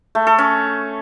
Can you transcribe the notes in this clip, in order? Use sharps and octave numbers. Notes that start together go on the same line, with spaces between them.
A3
A4
C#4